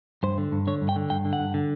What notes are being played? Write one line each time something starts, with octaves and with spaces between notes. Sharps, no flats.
G2 C5
D3
G2
D3 C#5
G2
G5
D3
G2 G5
D3
F#5
G2
D3